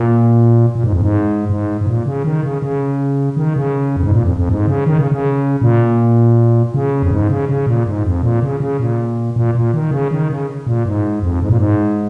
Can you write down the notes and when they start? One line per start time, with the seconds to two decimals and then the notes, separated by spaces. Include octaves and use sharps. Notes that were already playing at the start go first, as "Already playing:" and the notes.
Already playing: A#2
0.76 A#2
0.84 G#2
0.93 F2
1.02 G#2
1.50 G#2
1.81 G#2
1.87 A#2
2.06 C#3
2.25 D#3
2.43 C#3
2.62 C#3
3.37 D#3
3.56 C#3
3.96 F2
4.04 G#2
4.12 A#2
4.24 F2
4.37 F2
4.50 G#2
4.67 C#3
4.86 D#3
4.99 C#3
5.12 C#3
5.62 A#2
6.74 C#3
7.02 F2
7.11 G#2
7.30 C#3
7.49 C#3
7.67 A#2
7.87 G#2
8.05 F2
8.23 A#2
8.43 C#3
8.60 C#3
8.80 A#2
9.36 A#2
9.55 A#2
9.74 D#3
9.91 C#3
10.11 D#3
10.30 C#3
10.67 A#2
10.86 G#2
11.23 F2
11.42 G#2
11.49 A#2
11.58 G#2